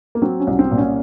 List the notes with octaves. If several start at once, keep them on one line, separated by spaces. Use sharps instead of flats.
A#3
F#3 C4
C#4
C2
C#4
C4
A#2
C#4